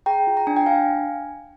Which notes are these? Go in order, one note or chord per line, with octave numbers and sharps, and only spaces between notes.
G#4 G5 A#5
F4
A#5
D4 G#5
G5
D4 F5 G#5